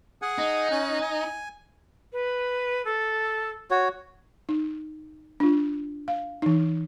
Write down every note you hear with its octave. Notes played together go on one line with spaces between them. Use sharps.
G#4 F#5 G#5
D#4
C#4 G#5 F#6
G#5
B4
A4
F#4 C#5
D#4
D4 F4
F5
E3 D#4